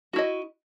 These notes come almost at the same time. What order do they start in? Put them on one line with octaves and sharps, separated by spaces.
F#4 E4 D#5